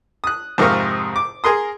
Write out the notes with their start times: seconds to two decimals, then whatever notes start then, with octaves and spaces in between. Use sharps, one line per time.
0.24 D#6 F#6
0.58 F2 G#2 C3 A#4 F5 C#6
1.16 D6
1.44 G#4 A#4 C6 D#6